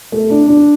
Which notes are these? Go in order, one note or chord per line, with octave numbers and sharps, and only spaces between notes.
A3
D4
D4